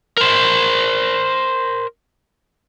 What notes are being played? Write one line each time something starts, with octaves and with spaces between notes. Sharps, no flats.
A#4 C5